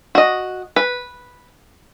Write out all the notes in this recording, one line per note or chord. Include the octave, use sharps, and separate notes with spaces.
F#4 D#5
B4